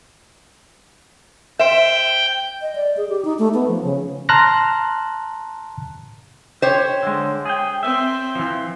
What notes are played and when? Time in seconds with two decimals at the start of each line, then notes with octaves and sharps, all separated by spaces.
1.59 C5 E5 G5
2.62 D#5
2.75 D5
2.97 G#4
3.09 G4
3.25 D#4
3.39 A3
3.54 B3
3.68 F3
3.84 C#3
4.29 A5 A#5 C6 F6 F#6 A#6
6.62 G4 C5 C#5
7.03 D3 G#3
7.46 G#4 G5
7.83 C4 E5
8.35 E3 F3